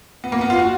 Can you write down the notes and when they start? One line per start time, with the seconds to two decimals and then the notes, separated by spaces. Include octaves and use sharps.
0.24 B3
0.32 A#3
0.41 B3
0.50 F4
0.59 F#4